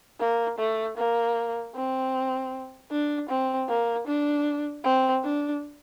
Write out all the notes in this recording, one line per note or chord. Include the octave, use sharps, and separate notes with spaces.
A#3
A3
A#3
C4
D4
C4
A#3
D4
C4
D4